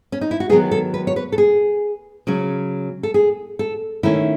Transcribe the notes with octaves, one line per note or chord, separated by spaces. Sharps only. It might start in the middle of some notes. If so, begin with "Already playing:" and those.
C#4
D#4
E4
F#4
D#3 F#3 B3 G#4
A4
B4
C#5
B4
A4
G#4
C#3 F#3 C#4
A4
G#4
A4
D#3 A3 C#4 E4